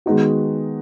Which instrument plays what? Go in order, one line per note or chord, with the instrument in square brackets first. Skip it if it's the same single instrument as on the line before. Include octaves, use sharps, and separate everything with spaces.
[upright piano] D#3 G#3 B3 D#4 F#4